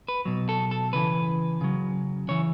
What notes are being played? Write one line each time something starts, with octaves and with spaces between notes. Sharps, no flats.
B4
B2 F#3
A4
A4
C#3 E3 B4
C#3 F#3
C#3 E3 C#5